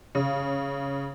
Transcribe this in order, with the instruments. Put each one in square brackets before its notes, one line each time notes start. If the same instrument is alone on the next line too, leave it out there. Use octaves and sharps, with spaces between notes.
[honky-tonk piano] C#3